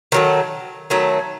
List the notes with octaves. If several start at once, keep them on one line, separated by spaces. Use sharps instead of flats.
D#3 F#3 A3
D#3 F#3 A3